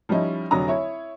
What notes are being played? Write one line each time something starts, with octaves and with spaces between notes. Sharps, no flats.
F3 G3 C#4 D#4 E4
F1 D3 F#3 A#5 D#6
E4 C#5